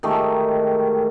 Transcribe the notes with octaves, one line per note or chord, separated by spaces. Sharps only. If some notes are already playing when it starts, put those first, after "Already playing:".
D#3 G#3 A3 G4